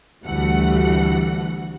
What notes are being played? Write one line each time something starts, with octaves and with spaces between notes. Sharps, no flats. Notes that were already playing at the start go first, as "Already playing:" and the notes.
D2 E3 G3 A3 F#5